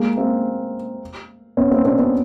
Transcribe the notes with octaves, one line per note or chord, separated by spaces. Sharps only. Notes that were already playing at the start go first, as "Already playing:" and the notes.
Already playing: G#3 A#3
A#3 C4
B3 C#4
A#3 C4
C4 D4
B3 C#4